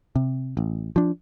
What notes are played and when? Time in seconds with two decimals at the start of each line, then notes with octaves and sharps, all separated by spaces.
0.16 C3
0.57 A1
0.96 F3 D4